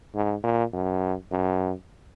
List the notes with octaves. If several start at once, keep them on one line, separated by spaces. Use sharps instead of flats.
G#2
A#2
F#2
F#2